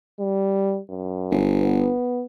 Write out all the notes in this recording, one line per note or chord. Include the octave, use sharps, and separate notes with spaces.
G3
F#2
G1
B3